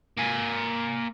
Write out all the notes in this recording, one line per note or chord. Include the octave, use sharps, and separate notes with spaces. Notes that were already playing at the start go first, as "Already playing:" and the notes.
A#3 G#5